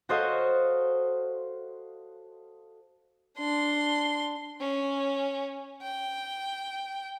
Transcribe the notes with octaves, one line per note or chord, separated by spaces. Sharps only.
F#4 A4 C5 C#5 D#5 F5
D4 C6
C#4
G5